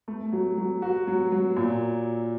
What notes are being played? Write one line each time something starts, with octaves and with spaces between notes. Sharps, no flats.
A3
F#3
F#3
F#4
F#3
F#3
A#2